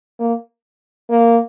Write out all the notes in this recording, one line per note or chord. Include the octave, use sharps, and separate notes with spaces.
A#3
A#3